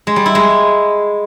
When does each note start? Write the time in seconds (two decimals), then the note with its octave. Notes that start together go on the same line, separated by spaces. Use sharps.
0.07 G#3
0.16 G3
0.26 E4
0.35 G#3